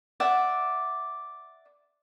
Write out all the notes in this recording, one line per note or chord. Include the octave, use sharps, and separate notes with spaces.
D5 E5 F#5